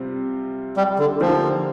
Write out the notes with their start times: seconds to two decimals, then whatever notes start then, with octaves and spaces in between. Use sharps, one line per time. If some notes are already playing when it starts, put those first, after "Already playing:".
Already playing: C3 G3 C4 F4 C5
0.77 G3
0.99 D3
1.21 D3 F3 A#3 G4 C5